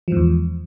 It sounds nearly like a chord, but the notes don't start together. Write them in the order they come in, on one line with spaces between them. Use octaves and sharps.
F3 G#2 E2